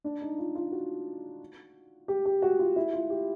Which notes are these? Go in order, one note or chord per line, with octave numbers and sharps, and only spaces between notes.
D4
D#4
F4
F4
F#4
G4
G4
F#4
F4
E4
F4
G4